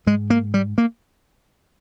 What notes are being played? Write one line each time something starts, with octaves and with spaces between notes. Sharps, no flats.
G#2 G#3
A#3
G3
A#3